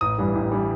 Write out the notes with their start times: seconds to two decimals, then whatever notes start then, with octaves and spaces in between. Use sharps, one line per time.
0.01 A1 D#6
0.18 G2 E3 G3
0.35 A1
0.52 E3 G3